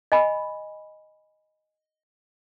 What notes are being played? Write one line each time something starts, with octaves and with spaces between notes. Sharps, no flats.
D#5 G#5 B5